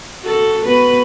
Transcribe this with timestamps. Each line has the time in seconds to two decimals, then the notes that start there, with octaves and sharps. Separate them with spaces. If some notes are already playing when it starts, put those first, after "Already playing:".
0.22 F#4 A4
0.62 B3 F#4 B4